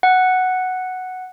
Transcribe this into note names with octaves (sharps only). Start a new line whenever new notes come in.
F#5